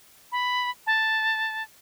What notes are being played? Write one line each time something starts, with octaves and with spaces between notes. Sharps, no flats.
B5
A5